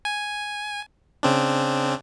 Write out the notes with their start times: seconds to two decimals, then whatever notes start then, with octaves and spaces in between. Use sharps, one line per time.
0.05 G#5
1.23 C#3 C4 D4